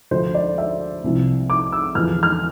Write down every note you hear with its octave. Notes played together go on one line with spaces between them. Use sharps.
D2 D3 F3 C5
D5
E5
C2 C3 F3
D6
E6
E2 D3 F3 F6
F6